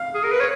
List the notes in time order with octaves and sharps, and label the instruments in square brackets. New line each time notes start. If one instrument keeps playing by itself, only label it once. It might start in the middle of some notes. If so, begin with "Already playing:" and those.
Already playing: [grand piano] F5
[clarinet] G#4
A#4
B4
C#5